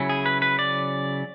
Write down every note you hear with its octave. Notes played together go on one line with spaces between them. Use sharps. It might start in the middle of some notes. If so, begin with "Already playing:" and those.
Already playing: C#3 F#3 C#4 E4
G#4
B4
B4
D5